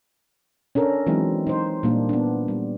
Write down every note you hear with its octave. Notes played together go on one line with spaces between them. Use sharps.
C#4 D4 A4 A#4
E3 F#3 G#3 C4 D#4 E4
D#4 C5
A#2 G3 A#3 D4
B3 D4
G3